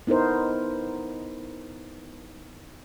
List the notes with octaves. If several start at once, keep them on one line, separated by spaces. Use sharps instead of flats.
B3 D#4 E4 A#4 C5